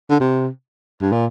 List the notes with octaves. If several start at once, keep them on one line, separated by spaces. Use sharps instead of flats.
D3
C3
G2
A#2